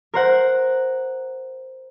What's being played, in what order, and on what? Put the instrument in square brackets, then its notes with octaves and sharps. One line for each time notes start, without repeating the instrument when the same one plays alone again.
[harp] A#4 C5 F#5